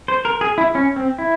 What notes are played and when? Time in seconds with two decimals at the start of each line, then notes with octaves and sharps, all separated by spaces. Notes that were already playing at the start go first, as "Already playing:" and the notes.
0.08 C5
0.25 A#4
0.41 G#4
0.58 E4
0.75 C#4
0.96 C4
1.19 E4